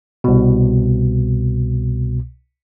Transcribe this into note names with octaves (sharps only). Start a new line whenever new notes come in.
C2 B2